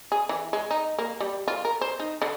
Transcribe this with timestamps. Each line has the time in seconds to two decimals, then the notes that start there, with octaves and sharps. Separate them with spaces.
0.12 G#4
0.29 E3
0.53 G#3
0.71 D#4
0.99 A#3
1.20 G3
1.48 F4
1.65 A#4
1.81 C5
2.00 D#4
2.22 D3